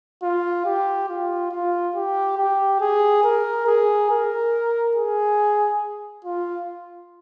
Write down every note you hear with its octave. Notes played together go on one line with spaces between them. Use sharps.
F4
G4
F4
F4
G4
G4
G#4
A#4
G#4
A#4
G#4
F4